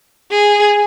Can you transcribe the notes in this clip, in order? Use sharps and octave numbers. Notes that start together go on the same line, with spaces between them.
G#4